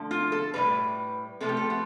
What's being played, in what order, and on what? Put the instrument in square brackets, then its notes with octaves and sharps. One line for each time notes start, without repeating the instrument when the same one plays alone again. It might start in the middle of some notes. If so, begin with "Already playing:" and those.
Already playing: [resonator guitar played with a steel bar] D3 F3 A3
F4
A4
A2 E3 G3 B4
C3 F3 A3 A4
G4
A4
B3